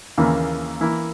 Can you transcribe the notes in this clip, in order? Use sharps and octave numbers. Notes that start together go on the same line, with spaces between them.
D#2 C#3 E3 A#3 E4
E3 A#3 E4